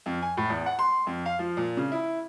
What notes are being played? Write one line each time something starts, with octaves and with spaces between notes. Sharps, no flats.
F2
G#5
A2
E2
F#5
C6
F2
F5
F3
A#2
C#3
E4